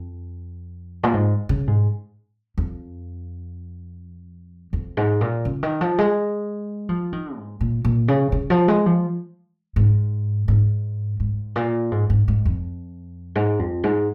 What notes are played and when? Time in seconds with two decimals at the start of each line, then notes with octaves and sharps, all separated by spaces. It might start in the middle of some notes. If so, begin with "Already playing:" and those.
Already playing: F2
1.03 A#2
1.14 G#2
1.49 C#3
1.67 G#2
2.58 F2
4.73 F2
4.97 G#2
5.21 A#2
5.45 C#3
5.63 D#3
5.81 F3
5.98 G#3
6.89 F3
7.13 D#3
7.37 G#2
7.61 A#2
7.85 A#2
8.08 C#3
8.32 C#3
8.50 F3
8.68 G#3
8.86 F3
9.76 G#2
10.48 G#2
11.20 G#2
11.56 A#2
11.91 G#2
12.10 G#2
12.28 G#2
12.45 F2
13.36 G#2
13.59 F2
13.84 G#2